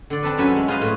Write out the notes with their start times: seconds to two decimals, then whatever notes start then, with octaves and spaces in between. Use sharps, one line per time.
0.10 D3 D5
0.23 C4 D4 A4 B4
0.38 F#2 F#3 C#4 B4 E5 G#5
0.56 G#3
0.68 F4 G#4 B4 C5 D#5 F5
0.81 A2